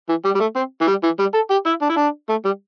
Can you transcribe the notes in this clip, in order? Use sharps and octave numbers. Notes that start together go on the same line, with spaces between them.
E3
G3
G3
A3
C4
E3
G3
E3
G3
A4
G4
E4
D4
E4
D4
A3
G3